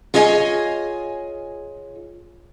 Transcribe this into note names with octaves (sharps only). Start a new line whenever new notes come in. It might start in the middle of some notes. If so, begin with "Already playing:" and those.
F4 G#4 C#5 D#5 G5 G#5